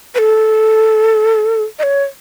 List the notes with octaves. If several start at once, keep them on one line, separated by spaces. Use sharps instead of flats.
B4
A4
D#5
C#5